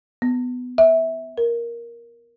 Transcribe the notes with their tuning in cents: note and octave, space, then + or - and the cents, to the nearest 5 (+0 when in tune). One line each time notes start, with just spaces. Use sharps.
B3 +15
E5 -15
A#4 +5